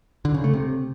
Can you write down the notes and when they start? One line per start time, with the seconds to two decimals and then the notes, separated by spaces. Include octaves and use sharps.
0.25 D3
0.34 C#3
0.44 A3
0.54 C3